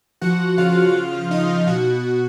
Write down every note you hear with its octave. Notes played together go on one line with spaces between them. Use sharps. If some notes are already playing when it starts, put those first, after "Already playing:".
F3 F#4 F#5
F3
C#3 F4 F5
C#3
C#3
F3
F3 D#4 D#5
C#3
B2 F#4 F#5
B2
B2